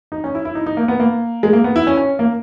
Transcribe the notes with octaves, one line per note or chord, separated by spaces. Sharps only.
D#4
C#4
E4
E4
D#4
D#4
A#3
B3
A#3
G#3
A#3
B3
E4
C#4
C#4
A#3